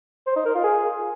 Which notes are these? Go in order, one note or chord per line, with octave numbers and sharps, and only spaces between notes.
C5
D#4
A#4
F4
G#4